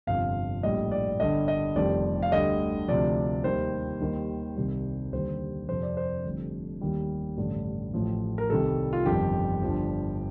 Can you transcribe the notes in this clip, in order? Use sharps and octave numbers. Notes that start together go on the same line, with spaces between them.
G1 F2 C3 F3 F5
A#1 A2 G3 D#5
D5
G1 G2 D3 G3 D#5
D#5
F1 F2 D#3 G3 D5
F5
D2 D3 G3 D#5
D2 C3 F3 D5
D#2 D#3 G3 C5
D#2 D#3 G3
C2 C3 D#3 G3
D#2 D3 G3 C5
F2 C3 F3 C5
D5
C5
F1 F2 D3 G3
D#2 D#3 G3
A1 G2 D3
A1 A2 F3
A#4
C2 C3 D#3 G3 A4
F4
G1 F2 D#3 G3 G4
G1 G2 F3